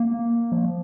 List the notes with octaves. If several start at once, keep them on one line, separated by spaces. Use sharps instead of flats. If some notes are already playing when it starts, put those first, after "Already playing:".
Already playing: A#3
F3